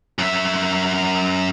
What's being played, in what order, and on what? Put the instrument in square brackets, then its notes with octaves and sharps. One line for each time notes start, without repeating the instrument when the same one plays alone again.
[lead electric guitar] F#2 E5